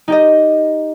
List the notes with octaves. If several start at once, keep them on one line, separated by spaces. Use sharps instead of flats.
D#4 G4 D#5